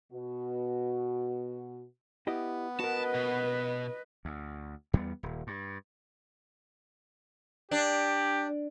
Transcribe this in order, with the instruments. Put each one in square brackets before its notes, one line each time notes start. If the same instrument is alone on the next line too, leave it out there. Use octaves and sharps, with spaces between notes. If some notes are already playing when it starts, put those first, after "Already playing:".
[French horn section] B2 F#4
[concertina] B3 [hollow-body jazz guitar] E4 G4 D#5
[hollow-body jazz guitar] F#4 A#4 [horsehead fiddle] B4 D#5 [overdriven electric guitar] A5
[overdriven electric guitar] B2
[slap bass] D2
E2 G3 A3 B3
D#1
G2
[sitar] D4 [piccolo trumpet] G4